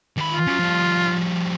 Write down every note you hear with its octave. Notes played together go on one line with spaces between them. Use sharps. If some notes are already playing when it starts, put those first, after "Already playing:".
D#2 B5
F4
C#4 F#4
F3 G3